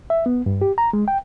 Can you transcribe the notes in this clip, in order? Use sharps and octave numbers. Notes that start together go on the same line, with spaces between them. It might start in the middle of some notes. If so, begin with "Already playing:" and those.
E5
B3
G2
G4
A#5
G#3
G5